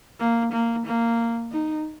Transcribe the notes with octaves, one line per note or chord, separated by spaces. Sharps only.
A#3
A#3
A#3
D#4